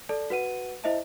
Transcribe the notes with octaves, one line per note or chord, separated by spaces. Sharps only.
A4 D5 A5
F#4 B4 F#5 D#7
E4 C5 D#5 E5 A5